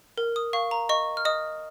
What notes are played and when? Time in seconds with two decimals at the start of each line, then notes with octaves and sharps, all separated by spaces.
0.18 A#4
0.36 D#6
0.53 F5 C#6
0.71 A#5
0.89 D#5 C#6
1.17 F6
1.25 D#5 D#6